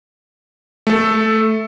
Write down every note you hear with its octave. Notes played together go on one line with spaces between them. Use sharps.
A3 A4